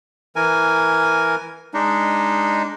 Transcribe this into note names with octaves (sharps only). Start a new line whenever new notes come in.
E3 A#4 G#5
G#3 D4 D#4